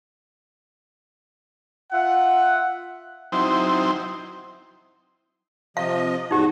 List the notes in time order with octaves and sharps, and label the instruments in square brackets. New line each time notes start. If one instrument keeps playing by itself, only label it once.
[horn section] F4 E5 F#5
[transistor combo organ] F#3 C4 D#4 E4 C5 G5
[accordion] C3 F3 D#5 [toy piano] F5
[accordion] E2 G#2 F#4 [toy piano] D#4 G4